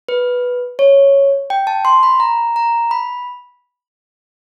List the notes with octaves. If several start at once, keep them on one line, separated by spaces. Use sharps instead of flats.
B4
C#5
G5
A5
C6
B5
A#5
A#5
B5